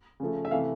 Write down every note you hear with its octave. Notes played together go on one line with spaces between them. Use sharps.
C#3 F3 A3
E5
C3 E3 A3 F5